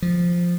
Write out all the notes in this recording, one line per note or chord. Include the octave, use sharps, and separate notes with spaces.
F3